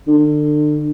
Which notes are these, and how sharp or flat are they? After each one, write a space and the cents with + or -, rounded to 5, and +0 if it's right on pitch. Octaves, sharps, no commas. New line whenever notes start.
D3 +30